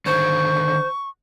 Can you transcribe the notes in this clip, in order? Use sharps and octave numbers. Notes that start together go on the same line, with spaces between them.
D3 D#3 C5 C#5 C#6